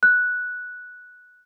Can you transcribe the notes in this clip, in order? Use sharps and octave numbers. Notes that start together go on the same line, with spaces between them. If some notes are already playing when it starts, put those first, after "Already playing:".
F#6